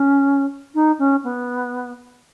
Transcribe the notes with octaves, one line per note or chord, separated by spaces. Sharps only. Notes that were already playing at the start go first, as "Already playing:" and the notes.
Already playing: C#4
D#4
C#4
B3